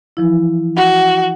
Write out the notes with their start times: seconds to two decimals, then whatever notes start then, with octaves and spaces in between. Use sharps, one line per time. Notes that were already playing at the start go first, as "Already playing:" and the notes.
0.17 E3 F3 E4
0.76 F#4 F#5